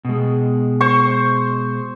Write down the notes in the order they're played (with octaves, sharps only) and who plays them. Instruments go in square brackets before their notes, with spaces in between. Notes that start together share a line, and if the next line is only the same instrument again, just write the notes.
[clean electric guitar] B2 G#3
[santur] C5 C#6